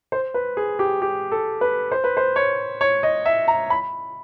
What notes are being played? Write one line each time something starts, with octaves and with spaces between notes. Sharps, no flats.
C5
B4
G#4
G4
G4
A4
B4
C5
B4
C5
C#5
C#5
D#5
E5
A#5
B5